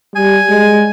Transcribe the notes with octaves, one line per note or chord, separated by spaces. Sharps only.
G3 G#5
G#3